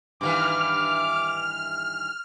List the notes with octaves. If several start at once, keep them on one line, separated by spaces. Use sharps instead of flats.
G2 D#3 E3 D6 F6